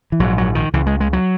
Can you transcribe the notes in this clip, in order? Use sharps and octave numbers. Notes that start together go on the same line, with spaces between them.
E3
A#1 G#2 F#3
F#3
D#3
C#2 C#3 E3
G#3
G#3
F#3